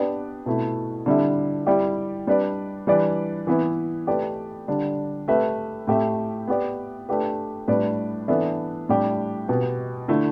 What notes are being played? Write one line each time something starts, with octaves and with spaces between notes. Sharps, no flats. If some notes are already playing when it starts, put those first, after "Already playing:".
Already playing: B3 D4 G4 B4 D5
B2 A3 E4
D3 G3 E4 A4 E5
G3 E4 G4 D5
G3 D4 B4 D5
E3 G3 D4 B4 D5
E3 B3 E4 B4
A3 G4 B4 D5
D3 G3 D4
A3 G4 B4 E5
A2 A3 G4 E5
B3 G4 D5
A3 D4 G4 B4
A2 G3 D4 B4 D5
E3 B3 D4 A4 E5
A2 G3 D4 G4
B2 B3 G4
D3 A3 E4 A4